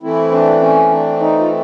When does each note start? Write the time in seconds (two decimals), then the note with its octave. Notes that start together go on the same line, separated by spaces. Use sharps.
0.03 E3 A3 C4 E4
0.32 D4
0.61 C#4
0.91 D4
1.20 D#4
1.39 F4